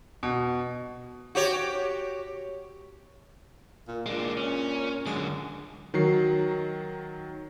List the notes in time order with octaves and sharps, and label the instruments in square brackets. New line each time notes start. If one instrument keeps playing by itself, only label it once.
[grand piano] B2
[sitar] F#4 G4 C#5
[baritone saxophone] A#2
[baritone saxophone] A#2 [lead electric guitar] G#3 D4
[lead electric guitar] C#4
[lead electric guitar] F#2 D3 [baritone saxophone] G#3
[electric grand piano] D#3 F#3 F#4 C7